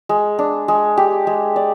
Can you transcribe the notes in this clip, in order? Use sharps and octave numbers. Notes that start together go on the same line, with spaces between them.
G#3
D4
G#3
G4
G#3
D5